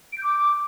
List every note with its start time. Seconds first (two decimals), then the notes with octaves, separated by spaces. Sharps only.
0.12 D7
0.18 G6
0.23 D6